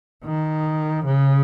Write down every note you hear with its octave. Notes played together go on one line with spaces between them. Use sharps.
D#3
C#3